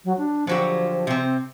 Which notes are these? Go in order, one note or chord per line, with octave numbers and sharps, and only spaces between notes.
F#3
D4
D3 F3 F#3 G4
C3 C4